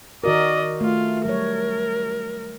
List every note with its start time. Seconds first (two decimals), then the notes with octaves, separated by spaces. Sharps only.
0.24 D#3 F#4 A#4 D5 D#5
0.81 A3 F4
1.25 F#3 G3 A#4 C#5